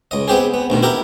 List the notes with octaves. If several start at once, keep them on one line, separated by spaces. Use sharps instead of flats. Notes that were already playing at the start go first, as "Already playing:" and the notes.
C#2 D#5
B3 C4 G4 G#4
B3
D2 B2 D#3
E4 G4 A#4